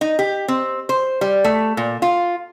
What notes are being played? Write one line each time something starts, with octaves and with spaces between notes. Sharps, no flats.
D#4
G4
C4
C5
G3
A3
A#2
F4